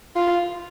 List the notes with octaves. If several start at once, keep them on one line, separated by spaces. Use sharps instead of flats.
F4